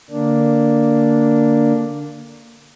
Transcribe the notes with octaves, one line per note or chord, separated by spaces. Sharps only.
D3 A#3 D4